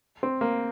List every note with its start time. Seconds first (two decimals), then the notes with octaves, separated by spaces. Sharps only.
0.23 C4
0.41 A#3